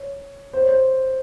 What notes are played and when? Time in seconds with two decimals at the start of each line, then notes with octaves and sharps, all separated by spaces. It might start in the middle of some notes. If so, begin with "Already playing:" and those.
Already playing: C#5
0.53 C5
0.61 C#5
0.69 C5